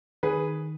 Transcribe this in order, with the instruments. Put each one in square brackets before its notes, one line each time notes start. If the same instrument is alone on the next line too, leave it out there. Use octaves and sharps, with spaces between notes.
[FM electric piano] D#3 [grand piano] G#4 B4